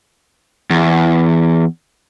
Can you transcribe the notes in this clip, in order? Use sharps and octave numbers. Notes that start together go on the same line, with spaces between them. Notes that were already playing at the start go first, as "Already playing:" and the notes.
E2